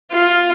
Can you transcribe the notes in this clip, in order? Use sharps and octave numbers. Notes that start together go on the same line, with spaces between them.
F4